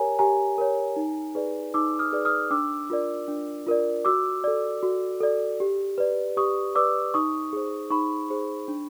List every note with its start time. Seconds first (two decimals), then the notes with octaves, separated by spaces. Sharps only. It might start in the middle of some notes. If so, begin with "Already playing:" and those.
Already playing: G4 A#4 C#5 G#5 A#5
0.19 G4 G#5 A#5
0.58 A#4 C#5
0.96 D#4
1.35 G#4 B4 D5
1.74 D#4 D6 E6
1.99 D#6 F6
2.13 G#4 B4 D5
2.25 D#6 F6
2.51 D4 D6 E6
2.90 F4 A#4 D5
3.28 D4
3.67 F4 A#4 D5
4.05 F#4 D6 E6
4.44 A4 D5
4.83 F#4
5.21 A4 D5
5.60 G4
5.98 B4 D5
6.37 G4 C#6 D#6
6.75 B4 D5 D6 E6
7.14 D#4 C#6 D#6
7.53 G#4 C5
7.90 D#4 B5 C#6
8.30 G#4 C5
8.68 D4